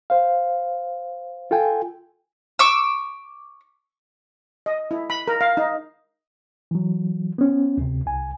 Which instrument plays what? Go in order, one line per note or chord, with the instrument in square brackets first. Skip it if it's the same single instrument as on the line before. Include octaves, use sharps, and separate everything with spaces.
[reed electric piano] C5 F5
F4 A4 G5 G#5
[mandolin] C#6 D6 E6
[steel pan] D#5
E4
B5
A#4
F5
D#4
[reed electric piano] E3 F#3
B3 C#4
D2 C3
C2 G#5